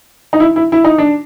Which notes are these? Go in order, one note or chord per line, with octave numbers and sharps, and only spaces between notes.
D#4
E4
E4
E4
D#4
D4